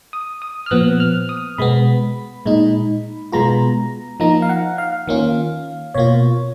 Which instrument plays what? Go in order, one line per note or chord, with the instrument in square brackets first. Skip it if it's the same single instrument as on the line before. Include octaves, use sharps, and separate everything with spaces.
[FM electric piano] D#6
D#6
F6
A#2 F3 B3 F#6
F6
D#6
B2 G#3 B3 B5
A#2 G#3 D#4
B2 G#3 B3 F4 A#5
F3 A#3 D#4 A#5
F5
F#5
F5
D#3 A#3 C#4 F4
B2 A#3 F4 C#5